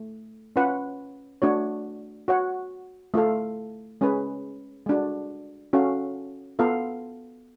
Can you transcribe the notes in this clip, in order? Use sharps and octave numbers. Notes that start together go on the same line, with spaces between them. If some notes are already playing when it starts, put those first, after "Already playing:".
Already playing: A3
C#4 F4 B4 F#5
A3 D4 F#4 C#5
F#4 C#5 F#5
A3 F4 A4 F5
G#3 C#4 G#4 B4
G#3 D4 F#4
C#4 F#4 A4 F5
B3 F4 A4 F5